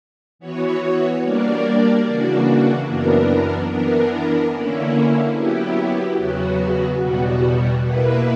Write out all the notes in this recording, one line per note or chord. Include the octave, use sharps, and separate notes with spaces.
E3 B3 F#4 C#5
G3 A#3 D4 A#4 D5
C#3 E3 A#3 D4 F#4
F#2 E3 B3 D4 A#4
E3 B3 D4 A#4
D3 A#3 C#4 E4
F#3 B3 E4 G4
E2 C#3 F#3 B3 F#4
E2 B2 G3 B3 F#4
B2 A#3 E4 B4